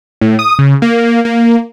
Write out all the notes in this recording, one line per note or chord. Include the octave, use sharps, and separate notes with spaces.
A2
D#6
C#3
A#3
A#3